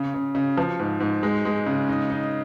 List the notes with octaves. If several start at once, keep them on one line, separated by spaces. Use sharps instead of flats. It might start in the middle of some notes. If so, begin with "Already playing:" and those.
Already playing: C#3
C#3
C#3
F3
G#2
G#2
G#3
G#3
C#3
D#4
D#4